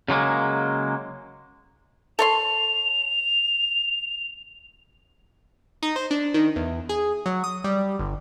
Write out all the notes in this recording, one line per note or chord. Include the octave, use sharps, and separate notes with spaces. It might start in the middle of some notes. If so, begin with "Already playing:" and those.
C#3 F#3 G#3 A#3
A4 C#5 C6 F7
D#4
C5
D4
D#3
E2
G#4
F#3
D#6
G3
G1